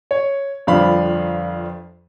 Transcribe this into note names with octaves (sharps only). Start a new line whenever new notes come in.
C#5
G1 F2 F3 D4 F5 B5